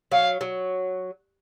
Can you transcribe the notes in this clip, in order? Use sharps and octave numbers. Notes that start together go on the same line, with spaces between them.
F#3 F5
F#3